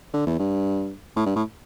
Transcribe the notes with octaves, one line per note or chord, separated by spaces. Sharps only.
D3
E2
G2
A2
G2
A2